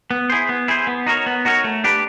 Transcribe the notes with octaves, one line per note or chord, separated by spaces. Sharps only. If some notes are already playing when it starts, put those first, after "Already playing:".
B3
E4 G#4 C5
B3
E4 G#4 C5
B3
D#4 F#4 A#4 C#5
B3
D#4 F#4 A#4 C#5
A3
D4 G4 B4